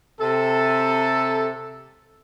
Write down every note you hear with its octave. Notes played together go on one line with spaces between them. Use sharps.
C3 A4